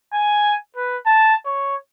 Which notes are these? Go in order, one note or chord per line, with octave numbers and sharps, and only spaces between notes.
G#5
B4
A5
C#5